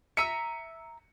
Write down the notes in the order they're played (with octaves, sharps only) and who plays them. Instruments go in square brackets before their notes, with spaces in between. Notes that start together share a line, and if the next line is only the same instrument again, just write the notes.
[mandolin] E5 A#5 E6 [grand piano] C#7 D#7